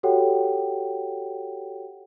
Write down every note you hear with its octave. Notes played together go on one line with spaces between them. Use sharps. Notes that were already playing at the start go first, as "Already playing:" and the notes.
F#4 G4 A4 C#5 F#5 G5